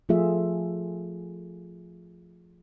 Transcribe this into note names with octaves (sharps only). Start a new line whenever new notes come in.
F3 A3 F4 G#4 E5